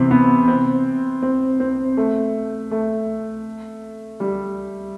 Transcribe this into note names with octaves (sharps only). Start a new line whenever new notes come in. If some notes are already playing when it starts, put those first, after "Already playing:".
Already playing: C3 E3 B3 C4
B3
C4
C4
C4
A3
A3
G3